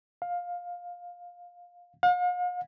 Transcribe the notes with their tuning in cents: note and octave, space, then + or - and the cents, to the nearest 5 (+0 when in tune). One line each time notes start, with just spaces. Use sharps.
F5 +15
F5 +45